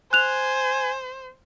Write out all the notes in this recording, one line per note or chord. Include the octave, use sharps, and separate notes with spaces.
C5 G#5 F#6 F7